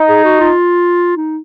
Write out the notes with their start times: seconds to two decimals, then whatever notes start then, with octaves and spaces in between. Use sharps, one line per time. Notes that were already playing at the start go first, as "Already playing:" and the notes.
Already playing: D#4
0.09 G#4
0.24 F#4
0.40 F4
1.17 D#4